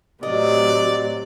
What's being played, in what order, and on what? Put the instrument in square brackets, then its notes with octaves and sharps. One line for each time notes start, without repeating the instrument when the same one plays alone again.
[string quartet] A2 C3 F#3 [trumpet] D5 [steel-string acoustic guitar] D#5